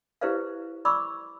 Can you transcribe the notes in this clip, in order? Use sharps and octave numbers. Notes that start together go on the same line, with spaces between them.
E4 G4 B4 C5 D5 F5
D5 B5 C#6 D6 E6